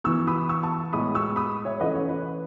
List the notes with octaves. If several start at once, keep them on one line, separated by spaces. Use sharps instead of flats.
E3 B3 C#6 E6
B5 D#6
C#6 E6
A5 C#6
A2 G#3 B3 B5 D#6
C#6 E6
B5 D#6
C#5 E5
E3 A3 C#4 B4 D#5
C#5
B4